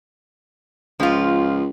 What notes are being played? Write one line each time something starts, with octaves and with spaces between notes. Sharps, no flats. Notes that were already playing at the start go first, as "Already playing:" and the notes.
C#2 F3 F4